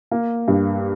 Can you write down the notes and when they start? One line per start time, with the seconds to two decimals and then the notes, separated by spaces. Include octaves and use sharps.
0.11 A#3
0.48 G2